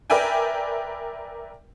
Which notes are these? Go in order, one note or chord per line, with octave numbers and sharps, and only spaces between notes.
A#4 B4 D5 E5 G5 G#5